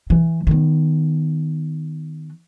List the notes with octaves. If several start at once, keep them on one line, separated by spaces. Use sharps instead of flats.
E3
D#3 B3